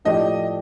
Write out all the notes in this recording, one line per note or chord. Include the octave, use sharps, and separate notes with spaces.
A2 F3 A3 D4 G4 D#5